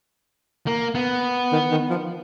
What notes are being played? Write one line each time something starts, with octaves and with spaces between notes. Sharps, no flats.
A#3
B3
D#3
D#3
F3